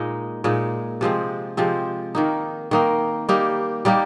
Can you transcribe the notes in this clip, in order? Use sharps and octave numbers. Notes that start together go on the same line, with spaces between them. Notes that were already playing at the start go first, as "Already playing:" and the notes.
Already playing: A#2 G#3 D#4
A#2 G#3 D#4
C3 F3 G#3 C4
C3 F3 G#3 C4
D#3 A#3 D#4
D#3 A#3 D#4
G3 A#3 D#4 G4
G3 A#3 D#4 G4